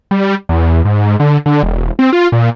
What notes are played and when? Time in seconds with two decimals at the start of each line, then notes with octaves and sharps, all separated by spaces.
0.11 G3
0.49 E2
0.85 G#2
1.20 D3
1.46 D3
1.63 E1
1.99 C4
2.13 F4
2.32 A#2